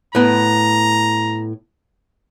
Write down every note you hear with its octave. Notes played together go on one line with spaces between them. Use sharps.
A2 B3 A#5